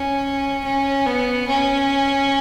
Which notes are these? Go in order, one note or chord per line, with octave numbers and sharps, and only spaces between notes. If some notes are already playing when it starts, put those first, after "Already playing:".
Already playing: C#4
C#4
B3
C#4